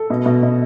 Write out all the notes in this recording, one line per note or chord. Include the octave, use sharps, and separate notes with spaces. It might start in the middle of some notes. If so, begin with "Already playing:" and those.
Already playing: A4
B2
B2
B2